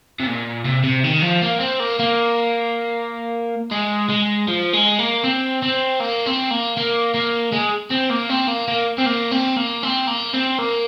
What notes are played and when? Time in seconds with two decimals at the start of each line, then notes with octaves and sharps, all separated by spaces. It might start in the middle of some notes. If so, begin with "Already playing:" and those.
0.20 C3
0.26 A#2
0.65 C3
0.84 C3
1.04 D#3
1.22 F3
1.42 A#3
1.60 C4
1.80 A#3
1.99 A#3
3.71 G#3
4.09 G#3
4.48 F3
4.73 G#3
4.99 A#3
5.24 C4
5.63 C4
6.00 A#3
6.26 C4
6.51 A#3
6.77 A#3
7.14 A#3
7.53 G#3
7.91 C4
8.11 A#3
8.30 C4
8.48 A#3
8.68 A#3
8.98 C4
9.06 A#3
9.32 C4
9.57 A#3
9.83 C4
10.07 A#3
10.34 C4
10.59 A#3